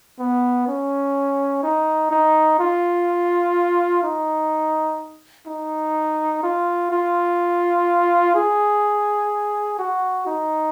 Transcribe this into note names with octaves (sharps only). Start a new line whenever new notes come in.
B3
C#4
D#4
D#4
F4
D#4
D#4
F4
F4
G#4
F#4
D#4